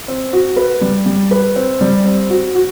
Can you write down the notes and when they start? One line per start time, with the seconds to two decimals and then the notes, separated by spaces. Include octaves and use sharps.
0.08 C4
0.33 F#4
0.56 B4
0.81 G3
1.06 G3
1.31 B4
1.56 C4
1.81 G3
2.06 C4
2.30 F#4
2.55 F#4